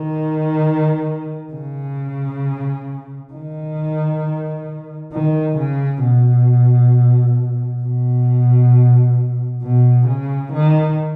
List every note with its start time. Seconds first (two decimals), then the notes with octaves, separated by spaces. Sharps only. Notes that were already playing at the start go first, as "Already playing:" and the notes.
Already playing: D#3
1.53 C#3
3.33 D#3
5.13 D#3
5.58 C#3
6.04 B2
7.83 B2
9.63 B2
10.08 C#3
10.53 D#3